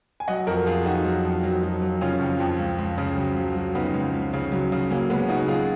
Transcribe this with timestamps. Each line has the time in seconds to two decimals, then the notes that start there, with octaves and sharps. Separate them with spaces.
0.20 G#5
0.28 F#3 D#5 F#5
0.47 F2 F#4 A#4
0.67 F2 F4 G#4
0.86 F2 D#4 F#4
1.05 F#3
1.25 F2
1.43 F#3
1.63 F#3
1.82 F#3
2.01 C#3 C#4 F4
2.21 F2
2.40 F2
2.59 C#2
2.78 C#2
2.98 C#3
3.17 F#3
3.37 F#3
3.56 F#3
3.75 C#3 B3 D#4
3.94 C#2
4.14 C#2
4.33 C#3
4.52 F#3
4.72 C#3
4.90 F#3 A#3 C#4
5.10 C#3 G#3 B3
5.29 C#3 D#4 F#4
5.48 F#3 F4 G#4